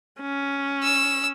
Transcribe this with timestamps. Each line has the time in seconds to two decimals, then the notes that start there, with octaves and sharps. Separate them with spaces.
0.21 C#4
0.83 E6